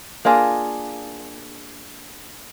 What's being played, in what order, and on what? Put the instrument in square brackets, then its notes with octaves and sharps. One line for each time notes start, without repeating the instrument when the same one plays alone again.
[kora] A#3 D4 F4 G#4